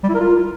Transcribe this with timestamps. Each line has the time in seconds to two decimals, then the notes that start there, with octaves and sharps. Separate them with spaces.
0.03 G3
0.09 E4
0.15 A#4
0.20 F4